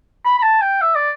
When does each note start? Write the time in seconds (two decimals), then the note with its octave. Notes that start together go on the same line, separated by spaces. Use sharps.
0.25 B5
0.38 B5
0.43 A5
0.62 G5
0.81 E5
0.96 D5